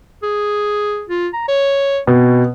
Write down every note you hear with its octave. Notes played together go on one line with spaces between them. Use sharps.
G#4
F4
A#5
C#5
B2 C4